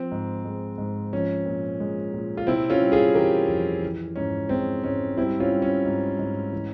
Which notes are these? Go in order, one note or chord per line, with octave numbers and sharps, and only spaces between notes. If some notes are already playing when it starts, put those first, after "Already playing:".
Already playing: F3 C4
G#2
G#3
G#2
F3 C#4
A#2
G#3
A#2
F4
C3 C4 E4
C#4 F4
G3
F4 G#4
E3 G4 A#4
F2
E3
G#2 C#4
G#3 C4
G#2 C#4
G3 C4 E4
C#4 F4
G3
C#4
G#2
G#2
E3